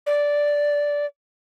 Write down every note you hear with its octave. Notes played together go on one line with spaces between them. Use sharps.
D5